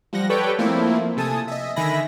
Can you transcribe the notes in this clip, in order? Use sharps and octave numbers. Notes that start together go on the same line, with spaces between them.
F3 G3 F#5 A#6
G4 A4 B4 C#5 D5 G5
F3 A3 A#3 C4 E4
C3 A4 G#5 A5 D#6
D#5 E5
D3 D#3 E5 G#5 B5 A#6